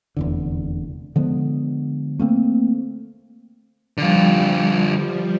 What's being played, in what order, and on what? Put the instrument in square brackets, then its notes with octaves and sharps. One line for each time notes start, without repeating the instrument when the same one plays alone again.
[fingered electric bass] F1 E2 D3
D3 F3 G#3 B3
A3 A#3 C4
[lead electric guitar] D3 F4 [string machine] F3 G3